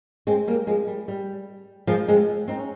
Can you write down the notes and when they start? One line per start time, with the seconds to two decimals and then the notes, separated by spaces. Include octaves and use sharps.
0.27 G#3 C4
0.47 G3 A#3
0.67 F3 G#3
0.87 G3
1.08 G3
1.87 F3 G#3
2.08 G#3 C4
2.48 C4 D#4
2.59 C#4